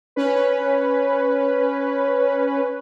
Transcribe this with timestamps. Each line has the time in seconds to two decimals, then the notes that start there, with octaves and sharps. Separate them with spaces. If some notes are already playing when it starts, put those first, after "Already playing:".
0.16 C#4 B4